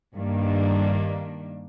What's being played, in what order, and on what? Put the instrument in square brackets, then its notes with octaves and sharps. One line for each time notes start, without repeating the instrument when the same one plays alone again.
[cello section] G2 D#3 G3 A#3 D4